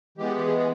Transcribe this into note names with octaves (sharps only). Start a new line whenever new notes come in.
E3 G#3 B3 G4
G4
G#4
G#4